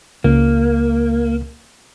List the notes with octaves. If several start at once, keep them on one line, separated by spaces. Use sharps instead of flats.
C#2 A#3